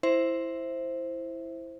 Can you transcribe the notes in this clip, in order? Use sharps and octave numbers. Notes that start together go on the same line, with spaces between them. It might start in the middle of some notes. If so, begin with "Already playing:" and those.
E4 C5 E5